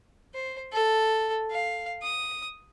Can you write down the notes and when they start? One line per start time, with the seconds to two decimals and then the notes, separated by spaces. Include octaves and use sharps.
0.34 C5
0.73 A4
1.51 F5
2.03 D#6